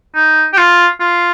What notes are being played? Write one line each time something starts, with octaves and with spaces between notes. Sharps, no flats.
D#4
G4
F4
F4